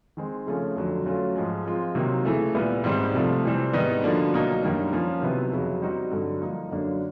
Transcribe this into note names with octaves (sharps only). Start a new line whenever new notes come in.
D#3 G#3 C4
C#3 F3 A3 C#4
F2 D3 F#3
F#3 A3 C#4 F4
G#2 F3 G#3
F3 G#3 C4 F4
C3 D#3 F#3 A#3
C#3 E3 A3
A#2 G3 B3 E4
G#2 D#3 G3 C4
C3 F3 A3
C3 E3 G3 C4
G#2 D#3 G3 B3 D#4
D3 F3 A#3 D4 F#4
B2 F#3 A#3 D#4
F#2 D#3 G3 A#3 D4
F3 A#3 C#4
C3 D#3 F#3 B3 E4
F2 C#3 F#3
G3 C4 D#4 F#4
G2 D3 F#3
F3 A#3 D#4
F#2 D3 F#3 A#3 D4